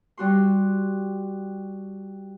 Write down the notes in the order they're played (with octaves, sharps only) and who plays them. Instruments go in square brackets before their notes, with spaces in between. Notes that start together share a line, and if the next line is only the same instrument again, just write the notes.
[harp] G3 F#4 C6